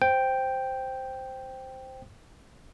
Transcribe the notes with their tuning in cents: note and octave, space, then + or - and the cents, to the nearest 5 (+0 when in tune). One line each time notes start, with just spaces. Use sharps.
C5 +0 G5 +0